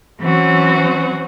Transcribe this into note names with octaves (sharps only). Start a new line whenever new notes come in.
E3 F#3 C4 C#4 F#4